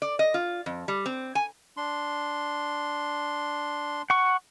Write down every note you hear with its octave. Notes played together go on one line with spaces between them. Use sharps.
D5
D#5
F4
F2
G3
C4
G#5
D4 C6
F#5 C#6